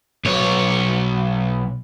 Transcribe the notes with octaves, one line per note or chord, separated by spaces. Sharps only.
B1 C#5